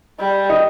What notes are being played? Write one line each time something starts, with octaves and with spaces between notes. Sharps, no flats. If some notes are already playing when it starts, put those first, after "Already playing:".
G3
D#4